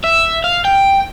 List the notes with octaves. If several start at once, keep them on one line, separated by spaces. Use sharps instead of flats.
E5
F5
G5